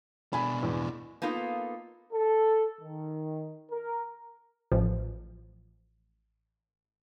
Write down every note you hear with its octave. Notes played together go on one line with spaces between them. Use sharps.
B2 D4 G#5 B5
E2
A#3 B3 D#4 F4 A4
A4
D#3
A#4
A1 F3